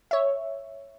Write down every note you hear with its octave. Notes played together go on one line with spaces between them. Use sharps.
C#5 E5